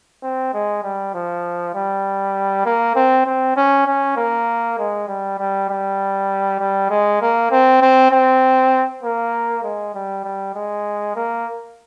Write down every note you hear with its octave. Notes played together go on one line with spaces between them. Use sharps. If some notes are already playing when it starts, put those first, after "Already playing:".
C4
G#3
G3
F3
G3
A#3
C4
C4
C#4
C#4
A#3
G#3
G3
G3
G3
G3
G#3
A#3
C4
C4
C4
A#3
G#3
G3
G3
G#3
A#3